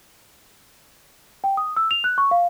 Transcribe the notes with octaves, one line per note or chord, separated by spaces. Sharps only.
G5
D#6
E6
F7
F#6
C#6
F5